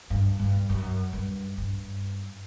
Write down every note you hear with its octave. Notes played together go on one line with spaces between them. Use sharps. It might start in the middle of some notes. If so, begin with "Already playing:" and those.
G2
G2
F#2
G2
G2